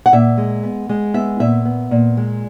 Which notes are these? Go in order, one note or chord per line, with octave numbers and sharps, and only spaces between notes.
F#5
A#2 E5
G#3
B3
G#3
B3 E5
A#2 E5
B3
A#2
G#3